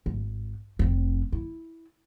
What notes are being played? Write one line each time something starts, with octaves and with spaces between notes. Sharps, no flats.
G#1
F1 C4
E4